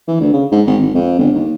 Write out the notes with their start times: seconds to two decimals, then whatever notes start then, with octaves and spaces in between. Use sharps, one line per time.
0.08 E3
0.20 D2
0.34 C#3
0.52 G#2
0.67 G#1
0.82 G#1
0.95 F2
1.19 G1
1.35 D#2